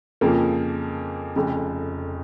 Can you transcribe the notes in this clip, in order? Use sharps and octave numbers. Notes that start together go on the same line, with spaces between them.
F2 C#3 F3 A#3
F1 F2 C#3